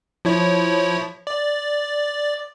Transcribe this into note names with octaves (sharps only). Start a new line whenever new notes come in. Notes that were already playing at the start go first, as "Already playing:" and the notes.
F3 E4 C#5
D5